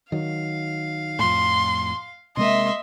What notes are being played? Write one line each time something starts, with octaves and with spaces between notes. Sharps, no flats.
D#3 F#3 F5
F2 A2 C6
C3 G#3 A#3 D#5 E5 C6